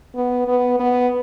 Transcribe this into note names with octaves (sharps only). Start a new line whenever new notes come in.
B3
B3
B3